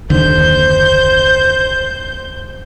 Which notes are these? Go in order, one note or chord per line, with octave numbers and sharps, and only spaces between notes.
F#1 D#2 D3 C5 G6